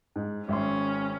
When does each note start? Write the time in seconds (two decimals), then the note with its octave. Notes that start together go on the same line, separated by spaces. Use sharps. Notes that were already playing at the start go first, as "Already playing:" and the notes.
0.16 G#2
0.48 G#1 C#4 E5 C6